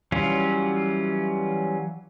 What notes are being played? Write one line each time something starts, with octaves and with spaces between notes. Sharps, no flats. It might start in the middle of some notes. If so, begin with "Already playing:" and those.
E3 F#3 G3 C#4 F4